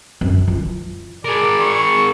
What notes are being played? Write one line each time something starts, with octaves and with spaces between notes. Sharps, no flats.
F#2
E3 F4
G#4 A#4 D5
C#6